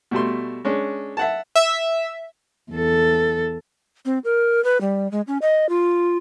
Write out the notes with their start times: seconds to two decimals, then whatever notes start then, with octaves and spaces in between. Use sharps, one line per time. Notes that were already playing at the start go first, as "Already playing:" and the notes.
0.11 B2 G3 A3 C6
0.65 G#3 C#4 D4
1.17 E5 F#5 A5
1.55 E5
2.71 E2 A4
4.05 C4
4.24 A#4
4.64 B4
4.81 G3
5.11 G#3
5.27 C#4
5.42 D#5
5.69 F4